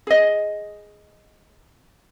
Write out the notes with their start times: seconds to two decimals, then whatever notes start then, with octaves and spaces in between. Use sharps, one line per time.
0.07 G#4 D#5